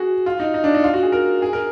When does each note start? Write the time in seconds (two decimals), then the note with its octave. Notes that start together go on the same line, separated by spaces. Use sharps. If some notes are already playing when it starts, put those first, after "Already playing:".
Already playing: F#4 G#4
0.26 F4
0.40 D#4
0.54 D#4
0.64 D4
0.74 D#4
0.84 F4
0.93 F#4
1.03 G#4
1.12 A#4
1.42 G#4
1.53 A#4